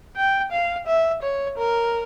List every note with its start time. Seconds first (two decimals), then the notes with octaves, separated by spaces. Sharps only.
0.16 G5
0.52 F5
0.87 E5
1.22 C#5
1.58 A#4